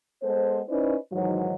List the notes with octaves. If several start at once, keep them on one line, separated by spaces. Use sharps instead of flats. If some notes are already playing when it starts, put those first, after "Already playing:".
G#3 B3 A4 C5
C#4 D#4 E4 B4 C5 D5
G#2 D#3 E3 F#3